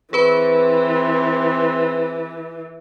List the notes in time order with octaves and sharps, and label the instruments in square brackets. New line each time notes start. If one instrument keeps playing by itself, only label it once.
[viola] E3 [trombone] C4 [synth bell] G#4 B4 B5